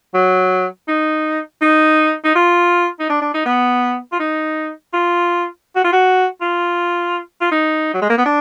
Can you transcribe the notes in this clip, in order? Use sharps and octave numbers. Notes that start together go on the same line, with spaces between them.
F#3
D#4
D#4
D#4
F4
D#4
D4
D4
D#4
B3
F4
D#4
F4
F#4
F4
F#4
F4
F4
D#4
F#3
G#3
A#3
B3
D4